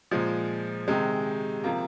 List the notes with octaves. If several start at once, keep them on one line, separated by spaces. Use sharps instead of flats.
A#2 F3 G#3
C3 D#3 G#3
C3 F3 A#3